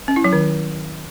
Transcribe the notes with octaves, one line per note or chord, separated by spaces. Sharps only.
C#4
E4
F#3
D#3